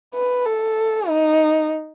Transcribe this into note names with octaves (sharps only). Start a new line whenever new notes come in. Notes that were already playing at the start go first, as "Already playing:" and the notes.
B4
A4
D#4